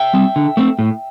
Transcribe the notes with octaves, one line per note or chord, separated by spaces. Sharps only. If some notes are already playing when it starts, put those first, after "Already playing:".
Already playing: E5 G5
G3 C4
D3
A3 C4
A2